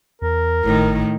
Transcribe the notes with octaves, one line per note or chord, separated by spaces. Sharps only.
E2 A#4
G#1 A2 D#3